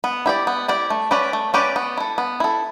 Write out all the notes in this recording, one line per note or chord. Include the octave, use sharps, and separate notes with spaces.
B3
E4 G4 D5
B3
E4 G4 D5
A3
C#4 G4 B4 D5
A3
C#4 G4 B4 D5
B3
E4 A4
B3
E4 A4